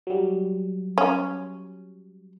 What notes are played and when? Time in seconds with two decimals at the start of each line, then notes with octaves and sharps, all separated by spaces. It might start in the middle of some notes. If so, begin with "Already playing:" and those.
0.07 F#3 G3
0.98 C#4